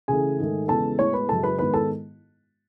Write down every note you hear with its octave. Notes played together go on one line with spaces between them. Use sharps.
C#3 E3 A3 G#4 G#5
G#2 D#3 A3
E2 C#3 G#3 B3 A4 A5
A2 G#3 B3 C#5 C#6
B4 B5
F#2 C#3 G#3 A4 A5
B4 B5
G#2 D#3 G#3 B3 B4 B5
A4 A5